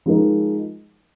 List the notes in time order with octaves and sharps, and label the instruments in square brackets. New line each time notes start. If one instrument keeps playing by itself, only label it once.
[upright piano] F3 G#3 D#4 A#4